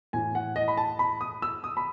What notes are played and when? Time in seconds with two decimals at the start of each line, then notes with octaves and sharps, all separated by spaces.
0.13 A2 E3 G#5
0.35 F#5
0.56 D#5
0.68 B5
0.77 A5
0.99 B5
1.21 D#6
1.42 E6
1.64 D#6
1.77 B5